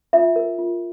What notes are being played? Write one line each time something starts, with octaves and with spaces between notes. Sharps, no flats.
F4 E5
A#4
F4